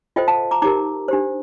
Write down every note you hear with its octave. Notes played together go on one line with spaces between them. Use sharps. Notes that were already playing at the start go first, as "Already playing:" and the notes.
F4 A4 C5 D#5 G5
F5 A5
A#5 D6
D#4 G4 A#4 A#5 D6
D4 G4 C5